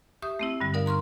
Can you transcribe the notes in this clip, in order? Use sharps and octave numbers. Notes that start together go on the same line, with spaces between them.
G4 E5 C#6 D#6
A3 C4 E4
G2 D3 G3
D#4 A#4 D5 F5
A#5 C6 C#6 F6